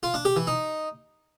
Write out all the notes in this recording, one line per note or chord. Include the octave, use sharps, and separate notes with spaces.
F4
D4
G4
E3
D#4